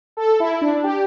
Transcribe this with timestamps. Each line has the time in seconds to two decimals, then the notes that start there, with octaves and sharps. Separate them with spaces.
0.17 A4
0.40 E4
0.61 D4
0.84 G4